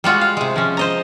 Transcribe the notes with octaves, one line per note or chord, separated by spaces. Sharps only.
G3 G#3 F4 F#4
F5
C3 G#3
F3 C#4
C5 D#5 A#5